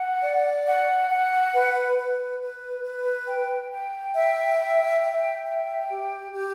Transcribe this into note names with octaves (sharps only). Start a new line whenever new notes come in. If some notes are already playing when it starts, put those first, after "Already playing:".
Already playing: F#5
D5
F#5
F#5
B4
B4
B4
B4
G5
G5
E5
G5
E5
G5
G4
G4